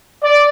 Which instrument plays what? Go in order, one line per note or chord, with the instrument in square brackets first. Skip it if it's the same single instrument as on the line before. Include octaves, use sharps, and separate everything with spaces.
[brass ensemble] D5